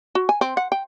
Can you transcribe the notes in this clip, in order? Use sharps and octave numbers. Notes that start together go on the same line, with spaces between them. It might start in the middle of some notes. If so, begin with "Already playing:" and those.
F#4
G#5
C4
F#5
G5